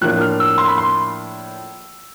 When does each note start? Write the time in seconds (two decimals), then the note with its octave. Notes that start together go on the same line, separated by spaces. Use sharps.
0.01 A2 F3 A#3 D4 F#6
0.21 F6
0.40 E6
0.58 C6
0.68 B5
0.78 C6